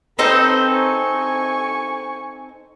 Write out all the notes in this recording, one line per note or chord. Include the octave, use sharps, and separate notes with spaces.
C4 D#4 A4 B4 C5
G#5 C#6